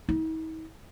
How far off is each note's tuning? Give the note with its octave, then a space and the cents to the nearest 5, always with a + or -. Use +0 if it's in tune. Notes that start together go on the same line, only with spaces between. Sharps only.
D#4 +45